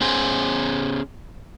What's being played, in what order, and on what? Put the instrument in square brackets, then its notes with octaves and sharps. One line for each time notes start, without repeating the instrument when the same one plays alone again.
[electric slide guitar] B3 C#4 G#4 C5